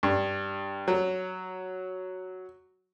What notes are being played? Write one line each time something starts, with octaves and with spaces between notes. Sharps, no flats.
G2
F#3